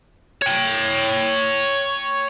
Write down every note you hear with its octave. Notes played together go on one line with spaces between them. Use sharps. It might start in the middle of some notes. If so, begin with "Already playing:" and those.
C#5 G5